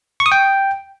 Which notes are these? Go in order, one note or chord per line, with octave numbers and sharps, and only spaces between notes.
C#6
D#6
G5